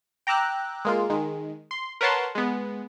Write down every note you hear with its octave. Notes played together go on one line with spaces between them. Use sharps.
G5 A#5 D6 E6 F#6
G#3 A#3 F4
D#3 G#3
C6
A#4 B4 C#5 F#5 A5 C6
G#3 B3